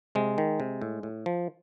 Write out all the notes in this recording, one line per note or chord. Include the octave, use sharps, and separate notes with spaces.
C3 G#3
D#3
C3
A2
A2
F3